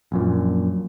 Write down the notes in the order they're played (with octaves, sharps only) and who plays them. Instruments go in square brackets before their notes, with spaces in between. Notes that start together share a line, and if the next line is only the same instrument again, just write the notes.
[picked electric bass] A#1 F#2 A#2